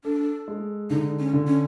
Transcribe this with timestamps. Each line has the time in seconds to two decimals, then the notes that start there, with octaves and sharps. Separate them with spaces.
0.04 D4 A4
0.48 G#3
0.90 D3 D#4
1.19 C#4
1.33 D3
1.47 C#4